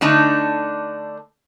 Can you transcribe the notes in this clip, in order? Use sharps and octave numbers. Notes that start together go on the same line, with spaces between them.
D3 A3 D4 D#4